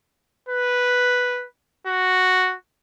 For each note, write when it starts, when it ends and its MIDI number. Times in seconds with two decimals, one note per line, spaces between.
0.49 1.46 71
1.87 2.55 66